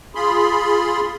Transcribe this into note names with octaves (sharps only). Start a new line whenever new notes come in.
F4 G#4 B5 C6